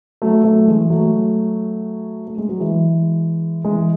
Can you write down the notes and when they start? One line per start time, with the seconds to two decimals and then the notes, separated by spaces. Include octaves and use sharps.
0.22 F#3 A3
0.44 F#3 A3
0.68 E3 G#3
0.90 F#3 A3
2.27 A3
2.38 G#3
2.49 F#3
2.60 E3 G#3
3.64 E3 G#3